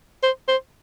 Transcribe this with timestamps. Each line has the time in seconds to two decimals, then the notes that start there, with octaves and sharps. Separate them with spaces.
0.23 C5
0.48 C5